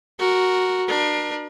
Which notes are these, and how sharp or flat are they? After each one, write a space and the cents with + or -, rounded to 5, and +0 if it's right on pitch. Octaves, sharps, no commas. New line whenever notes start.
F#4 +0 A#4 +0
D4 +35 A#4 +40